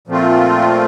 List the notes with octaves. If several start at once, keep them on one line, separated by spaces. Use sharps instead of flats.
A#2 F3 A3 C4 F4